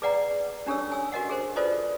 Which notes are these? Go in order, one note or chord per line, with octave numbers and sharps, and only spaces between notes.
G#4 B4 D5 F#5 G5 A#5
C#4 D4 G4 A4 C#5 E6
G#5 E6
F#4 A#4 D#5 F#5
G#4 A#4 C5
F4 A4 B4 C5 D5 D#5